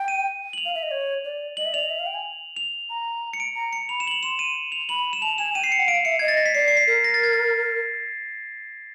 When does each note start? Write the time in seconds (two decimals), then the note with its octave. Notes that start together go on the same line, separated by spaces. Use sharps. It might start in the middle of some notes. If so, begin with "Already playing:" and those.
Already playing: G5
0.08 D#7
0.53 F#7
0.58 F7
0.65 F5
0.75 E5
0.83 D#5
0.91 C#5
1.25 D5
1.57 D#5 F#7
1.65 E5
1.73 D5 F7
1.82 D#5
1.90 E5
1.99 F5
2.06 G5
2.15 G#5
2.56 F7
2.90 A#5
3.33 C#7
3.40 D7
3.56 A#5
3.73 C#7
3.89 B5 F7
4.00 E7
4.07 F#7
4.11 F7
4.23 C6 E7
4.39 D#7
4.72 F7
4.89 B5 F#7
5.13 E7
5.21 A5 F7
5.38 G#5 E7
5.55 G5 D#7
5.64 C7
5.72 C#7
5.79 F#5
5.88 F5 D7
6.05 E5 C#7
6.19 D#5 G#6
6.28 A6
6.37 A#6
6.46 B6
6.54 D5 C7
6.68 C7
6.77 B6
6.87 A#4 B6
7.04 A#6
7.14 A6
7.24 G#6
7.33 A6